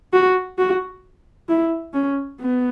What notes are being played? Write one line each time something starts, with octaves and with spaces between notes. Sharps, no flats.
F#4
F#4
E4
C#4
B3